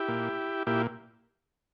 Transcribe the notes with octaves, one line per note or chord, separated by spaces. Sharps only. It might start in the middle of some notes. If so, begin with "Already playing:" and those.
Already playing: E4 G4
A#2
A#2 E4 G4